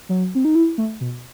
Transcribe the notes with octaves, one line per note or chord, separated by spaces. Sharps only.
F#3
C4
D#4
E4
A3
B2